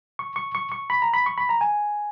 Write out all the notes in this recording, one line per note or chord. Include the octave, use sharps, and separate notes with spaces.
C#6
C#6
C#6
C#6
B5
A#5
B5
C#6
B5
A#5
G#5